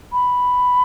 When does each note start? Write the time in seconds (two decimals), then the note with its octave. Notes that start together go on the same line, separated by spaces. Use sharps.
0.13 B5